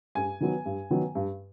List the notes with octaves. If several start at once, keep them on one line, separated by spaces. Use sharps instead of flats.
G2 G#5
D#3 F#3 B3
G2
D#3 F#3 B3
G2